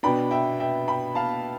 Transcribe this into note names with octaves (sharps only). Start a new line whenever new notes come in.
B2 B3 D4 G5 B5
E5 G5
E5 G5
G5 B5
F5 A5